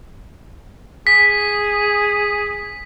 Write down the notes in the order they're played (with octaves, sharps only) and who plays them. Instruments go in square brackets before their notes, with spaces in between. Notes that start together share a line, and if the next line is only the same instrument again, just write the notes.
[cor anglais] G#4 [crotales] B6